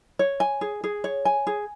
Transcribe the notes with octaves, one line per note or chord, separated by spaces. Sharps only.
C#5
G#5
G#4
G#4
C#5
G#5
G#4